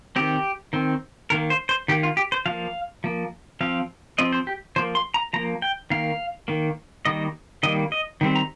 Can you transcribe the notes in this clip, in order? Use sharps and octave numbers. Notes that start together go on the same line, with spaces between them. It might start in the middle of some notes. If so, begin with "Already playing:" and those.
D#3 C4 G4
D#3 C4
D#3 A#3 A#4
C5
C5
D#3 A#3 G4
F4
G4
C5
F3 A#3 F5
F3 A#3
F3 C4 F5
F3 C4 D#5
C5
G4
F3 A#3 C5
C6
A#5
F3 A#3 A#5
G5
D#3 A#3 F5
D#3 A#3
D#3 G3 A#3 D#5
D#3 G3 A#3 D#5
D#5
D#3 G3 C4
A#5